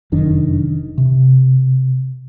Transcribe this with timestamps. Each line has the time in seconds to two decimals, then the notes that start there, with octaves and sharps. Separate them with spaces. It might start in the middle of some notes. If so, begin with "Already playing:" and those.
0.12 F1 F#2 D#3 D4
0.98 C3